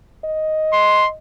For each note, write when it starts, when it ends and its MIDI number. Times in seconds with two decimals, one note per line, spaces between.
0.24 1.16 75
0.73 1.07 84